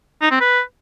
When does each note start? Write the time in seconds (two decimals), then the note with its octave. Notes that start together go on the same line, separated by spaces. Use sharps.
0.22 D#4
0.31 C4
0.40 B4